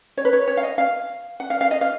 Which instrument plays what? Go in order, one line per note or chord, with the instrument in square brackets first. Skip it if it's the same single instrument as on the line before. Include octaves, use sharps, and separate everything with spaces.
[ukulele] C#5
B4
C#5
C#5
F5
D#5
F5
F#5
F5
F5
D#5
F5